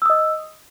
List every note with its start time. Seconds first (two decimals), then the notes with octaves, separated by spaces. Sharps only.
0.02 E6
0.06 D#6
0.10 D#5